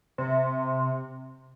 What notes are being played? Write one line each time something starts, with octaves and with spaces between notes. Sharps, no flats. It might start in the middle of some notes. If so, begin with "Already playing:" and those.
C3